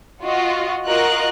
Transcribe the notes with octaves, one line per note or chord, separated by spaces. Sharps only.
F4 F#4 D#5
F4 F#4 A#4 D#5 F5 F#6